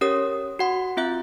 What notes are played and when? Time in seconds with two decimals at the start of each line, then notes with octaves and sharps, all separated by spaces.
0.01 C#4 G4 A#4 C#5 D#6
0.59 F#4 F#5 C6
0.97 C4 F4 E5 F#6